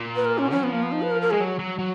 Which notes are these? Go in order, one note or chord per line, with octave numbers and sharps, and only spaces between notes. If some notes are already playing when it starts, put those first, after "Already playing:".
Already playing: A#2
B4
A#4
C#4
F#3 C#4
F3 B3
A#3
B3
D#4
B4
A#4
A#4
G#3 G#4
F#3
F#3
F#3